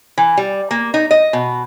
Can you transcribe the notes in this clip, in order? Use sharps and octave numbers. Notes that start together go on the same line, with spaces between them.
E3
G3
A#3
D#4
D#5
B2